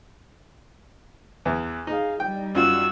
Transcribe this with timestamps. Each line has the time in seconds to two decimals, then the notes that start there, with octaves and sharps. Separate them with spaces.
1.45 E2 E3
1.87 D#4 G#4 F5
2.20 G3 D#4 G5
2.55 F#2 F4 F#4 E6